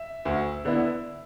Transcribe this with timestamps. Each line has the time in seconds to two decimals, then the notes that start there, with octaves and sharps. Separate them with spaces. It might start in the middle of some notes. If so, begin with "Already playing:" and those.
Already playing: E5
0.25 D2
0.65 D3 B3 E4